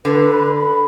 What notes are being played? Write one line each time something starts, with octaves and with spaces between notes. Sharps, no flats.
D3 B4
B5
B5